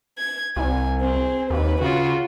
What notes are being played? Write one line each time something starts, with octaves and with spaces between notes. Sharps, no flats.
G#6
C2 G#5
C4 G#4
D#2 B4
C#3 F4 F#4